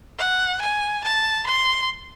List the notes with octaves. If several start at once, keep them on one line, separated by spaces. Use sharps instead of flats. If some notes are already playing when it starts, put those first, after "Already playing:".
F#5
G#5
A5
C6